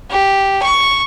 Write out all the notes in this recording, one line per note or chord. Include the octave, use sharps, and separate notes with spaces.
G4
C#6